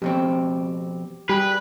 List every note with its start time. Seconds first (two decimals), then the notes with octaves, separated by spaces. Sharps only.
0.02 F2 B2 C4 G4
1.29 G3 G4 G#4 B4